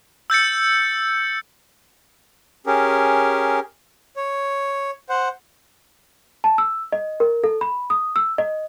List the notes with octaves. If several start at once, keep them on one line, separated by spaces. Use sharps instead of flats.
E6 G6 A6 C#7
C#4 G4 G#4 A#4
C#5
C5 F#5
A5
E6
D#5
A#4
A4
B5
D#6
E6
D#5